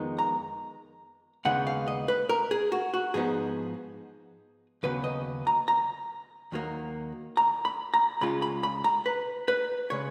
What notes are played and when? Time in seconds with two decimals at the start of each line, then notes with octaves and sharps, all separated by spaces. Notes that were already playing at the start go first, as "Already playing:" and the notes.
Already playing: F2 D#3 G#3 B3 D#4
0.19 A#5
1.45 D#2 C#3 G#3 B3 D#4 F#5
1.67 F5
1.88 D#5
2.08 B4
2.29 A#4
2.51 G#4
2.72 F#4
2.94 F#4
3.14 G#2 F3 B3 D#4 G#4
4.83 D#2 C#3 F#3 B3 B4
5.04 D#5
5.47 A#5
5.68 A#5
6.52 D#2 D#3 F#3 A#3
7.37 A#5
7.65 B5
7.94 A#5
8.21 C#2 C#3 G#3 C#4 F4 B5
8.42 B5
8.63 B5
8.84 A#5
9.06 B4
9.48 B4
9.90 C#3 G#3 C#5